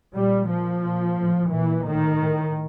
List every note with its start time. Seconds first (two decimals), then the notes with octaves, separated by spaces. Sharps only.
0.15 A#2 G3
0.49 A#2 F3
0.83 A#2
1.17 A2
1.51 A#2 E3
1.85 A2 D#3
2.20 A2